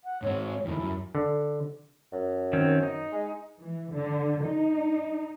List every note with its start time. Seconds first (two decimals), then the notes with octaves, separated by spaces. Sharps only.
0.04 F#5
0.22 G#2 C4 C#5
0.65 F2 D#3 E4
0.80 F#2
1.15 D3
2.12 F#2
2.53 D#3 C4 C#4
2.83 D#4
3.12 G#3
3.58 E3
3.94 D3
4.44 D#4